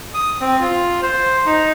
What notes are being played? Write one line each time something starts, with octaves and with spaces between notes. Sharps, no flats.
D#6
C4
F4
C5
D#4